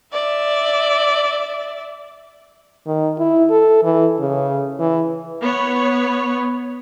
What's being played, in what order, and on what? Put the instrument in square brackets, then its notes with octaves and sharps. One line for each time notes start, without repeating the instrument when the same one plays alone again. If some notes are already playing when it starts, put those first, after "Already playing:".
[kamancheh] D5 E5
[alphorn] D#3
E4
A4
E3
C#3
E3
[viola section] B3 C#5